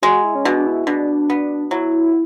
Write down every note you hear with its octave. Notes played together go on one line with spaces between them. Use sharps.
G#3 F#4
E4
C#4
B2 D4
D4
E4
B2 D4
B3
F#3 E4